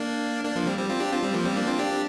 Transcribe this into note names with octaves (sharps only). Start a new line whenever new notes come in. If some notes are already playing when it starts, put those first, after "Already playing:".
Already playing: A#3 D4
A#3 D4
F3 A#3
G3 C4
G3 C4
C4 F4
D4 G4
C4 F4
G3 C4
F3 A#3
G3 C4
A#3 D4
C4 F4
D4 G4